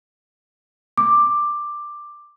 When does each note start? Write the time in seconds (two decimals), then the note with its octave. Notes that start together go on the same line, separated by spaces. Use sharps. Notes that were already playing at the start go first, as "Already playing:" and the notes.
0.98 D6